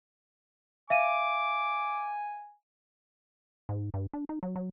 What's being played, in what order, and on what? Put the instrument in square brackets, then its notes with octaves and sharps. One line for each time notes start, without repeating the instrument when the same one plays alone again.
[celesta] E5 F5 D#7 [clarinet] G#5 [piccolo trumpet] D6
[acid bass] G#2
G2
D4
D#4
F#3
F#3